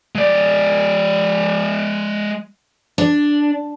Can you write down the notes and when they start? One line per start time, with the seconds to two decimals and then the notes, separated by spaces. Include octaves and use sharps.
0.15 G#3 D5
2.98 D4